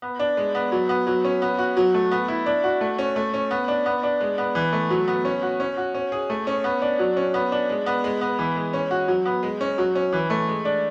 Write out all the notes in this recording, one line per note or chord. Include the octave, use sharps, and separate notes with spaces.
B3
D4
G#3
B3
F#3
B3
F#3
C#4
B3
F#4
F#3
A3
B3
E4
D4
F#4
A3
C#4
A3
C#4
B3
D4
B3
D4
G#3
B3
E3
A3
F#3
B3
C#4
F#4
C#4
F#4
C#4
G#4
A3
C#4
B3
D4
F#3
C#4
B3
D4
G#3
B3
G#3
B3
E3
G#3
C#4
F#4
F#3
B3
G#3
C#4
F#3
C#4
E3
A3
G#3
D4